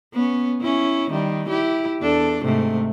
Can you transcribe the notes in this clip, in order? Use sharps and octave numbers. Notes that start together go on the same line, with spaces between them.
B3 C#4
C#4 E4
D#3 G3
E4 G4
E2 D4 A4
G#2 C3 A3